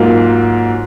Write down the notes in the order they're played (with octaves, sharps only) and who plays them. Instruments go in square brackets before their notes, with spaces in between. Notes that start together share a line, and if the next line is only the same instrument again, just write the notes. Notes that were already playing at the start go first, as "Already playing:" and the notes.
Already playing: [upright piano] G#2 F#3 A#3 F4